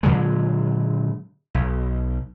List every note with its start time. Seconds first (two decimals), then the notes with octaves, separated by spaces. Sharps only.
0.03 A#2 D3 F#3 G#3
1.54 B1